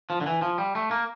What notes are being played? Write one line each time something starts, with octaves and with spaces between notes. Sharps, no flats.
F3
D3
E3
F3
G3
A3
A#3